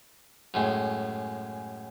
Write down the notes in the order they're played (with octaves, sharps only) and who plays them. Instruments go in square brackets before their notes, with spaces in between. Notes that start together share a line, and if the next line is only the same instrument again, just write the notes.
[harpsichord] F#2 A2 G#3